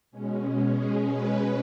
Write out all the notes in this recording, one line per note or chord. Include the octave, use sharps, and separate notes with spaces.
B2 G#3 C#4
B2 G#3 C#4 G#4
B4